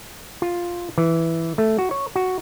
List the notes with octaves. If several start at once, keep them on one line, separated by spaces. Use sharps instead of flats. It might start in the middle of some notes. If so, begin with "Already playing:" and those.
F4
E3
A3
F#4
C#5
F#4